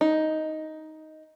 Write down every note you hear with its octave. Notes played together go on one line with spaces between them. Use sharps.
D#4